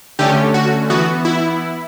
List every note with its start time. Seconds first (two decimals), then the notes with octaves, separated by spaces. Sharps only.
0.19 D3 A3 C#4 G4
0.54 F#4
0.90 E3 B3 F#4
1.25 E4